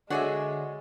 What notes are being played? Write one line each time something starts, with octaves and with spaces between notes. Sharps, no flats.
D3 G#3 F#4 G#4 C#5 D5 E5